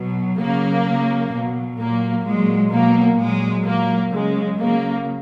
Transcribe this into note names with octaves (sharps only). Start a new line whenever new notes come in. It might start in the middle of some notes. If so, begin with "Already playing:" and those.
Already playing: B2 F#3
C#3 F#3 A#3
C#3 F#3
B2 F#3
A#2 F#3 A#3
A#2 F#3 G#3
B2 F#3 A#3
A#2 F#3 G#3
A#2 F#3 A#3
C#3 F#3 G#3
C#3 F#3 A#3